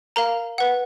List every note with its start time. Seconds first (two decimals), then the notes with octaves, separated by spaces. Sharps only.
0.16 A#4 F5 A#5
0.58 B4 F#5